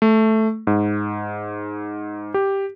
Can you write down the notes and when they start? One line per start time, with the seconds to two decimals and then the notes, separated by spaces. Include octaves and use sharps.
0.02 A3
0.67 G#2
2.34 G4